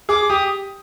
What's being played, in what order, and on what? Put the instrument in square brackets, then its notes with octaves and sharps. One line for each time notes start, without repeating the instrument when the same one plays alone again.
[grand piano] G#4 [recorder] D6
[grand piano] G4 [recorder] D#6